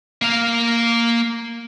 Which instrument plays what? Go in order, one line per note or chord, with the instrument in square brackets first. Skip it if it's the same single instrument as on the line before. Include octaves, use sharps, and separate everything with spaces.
[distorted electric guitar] A#3 F5